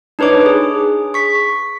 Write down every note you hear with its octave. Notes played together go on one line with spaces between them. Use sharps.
D4 D#4 B4 C#5 D6
G#4
C#6 B6